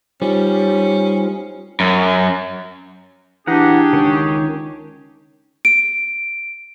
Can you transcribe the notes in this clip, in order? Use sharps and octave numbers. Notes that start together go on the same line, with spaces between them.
G3 C#4 D#4 F4 C5
F#2
E3 D4 G4 G#4 F#5 A#5
C#2 D#3 C#5
D7